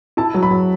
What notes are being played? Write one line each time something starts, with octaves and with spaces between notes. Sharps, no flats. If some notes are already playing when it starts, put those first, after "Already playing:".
E4 A5
F#3
B5
F#3